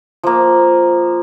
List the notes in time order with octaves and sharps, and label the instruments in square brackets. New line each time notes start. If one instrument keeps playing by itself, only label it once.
[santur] F3 A#3